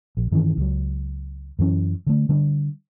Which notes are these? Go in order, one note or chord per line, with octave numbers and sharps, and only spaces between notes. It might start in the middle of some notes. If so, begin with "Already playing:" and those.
A#1
G2 D#3 E3 C#4
C#2 F#3
F#2 E3 C#4
D3 A3
D3 G3 D4